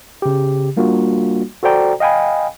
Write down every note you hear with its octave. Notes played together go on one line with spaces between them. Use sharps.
C#3 G4
G3 A#3 D4 F4 F#4
F#4 A4 C5 D5 G5 A#5
D#5 F5 G5 G#5 B5